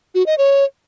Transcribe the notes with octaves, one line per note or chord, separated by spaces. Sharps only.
F#4
D#5
C#5